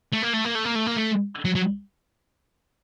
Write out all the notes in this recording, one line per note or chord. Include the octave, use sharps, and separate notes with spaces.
A3
A#3
A3
A#3
A3
A#3
A3
A#3
A3
F#3
F#3